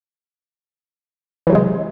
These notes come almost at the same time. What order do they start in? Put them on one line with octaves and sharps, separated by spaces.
E3 F#3 C3 G#3